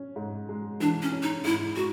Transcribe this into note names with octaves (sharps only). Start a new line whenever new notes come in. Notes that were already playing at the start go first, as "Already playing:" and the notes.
Already playing: C#4
G#2
G#3
E3 D4
C#4
C#4
D#4
G#2 E4
G#3 F#4